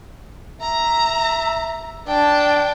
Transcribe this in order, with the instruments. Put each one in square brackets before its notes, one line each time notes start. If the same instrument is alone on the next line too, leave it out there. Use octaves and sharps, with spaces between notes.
[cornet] E5 [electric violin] A#5
[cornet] D4 [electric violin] G5 A5